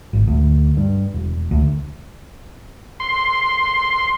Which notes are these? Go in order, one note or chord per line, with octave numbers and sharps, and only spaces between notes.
G#1
D2
G2
E1
D2
C6